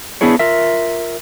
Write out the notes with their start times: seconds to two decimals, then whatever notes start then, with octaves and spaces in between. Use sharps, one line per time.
0.21 B3 D4 E4 G#4 C#5
0.39 F4 A#4 E5